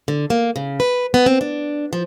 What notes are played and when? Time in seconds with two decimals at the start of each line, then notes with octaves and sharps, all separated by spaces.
0.08 D3
0.30 A#3
0.56 C#3
0.80 B4
1.14 B3
1.26 C4
1.41 D4
1.93 F3